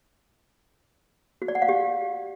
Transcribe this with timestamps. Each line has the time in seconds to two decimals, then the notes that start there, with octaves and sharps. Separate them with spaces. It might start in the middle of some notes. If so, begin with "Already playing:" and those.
1.42 F#4
1.48 D5
1.55 F#5
1.62 F5
1.69 G4